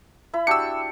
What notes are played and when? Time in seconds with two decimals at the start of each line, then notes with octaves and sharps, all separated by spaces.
0.33 E4 B5
0.47 D4 F#4 G4 E6 C#7